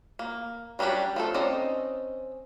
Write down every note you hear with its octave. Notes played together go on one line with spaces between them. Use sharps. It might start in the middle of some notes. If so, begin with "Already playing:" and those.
A#3
F#3 G3 C#4 D4 G4
F3 A3 A4
C4 C#4 D#4 D5 D#5